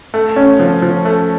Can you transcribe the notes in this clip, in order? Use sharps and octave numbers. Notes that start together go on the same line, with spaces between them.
A3
C#4
F3
F3
A3